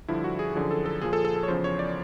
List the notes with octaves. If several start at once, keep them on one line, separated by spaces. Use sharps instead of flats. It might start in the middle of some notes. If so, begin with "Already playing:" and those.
G2 D3 F3 E4
F#4
G#4
F#2 D3 F3 G#4
A4
A4
A#2 F3 G#4
A4
A4
A4
C#5
E2 C#3 F3 C5
C#5
D5